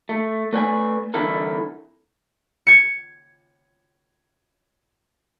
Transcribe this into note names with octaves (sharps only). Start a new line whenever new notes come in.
A3
A3 B4 D5 G5 G#5
C2 D3 E3 E4 A4 A#4
G#6 C#7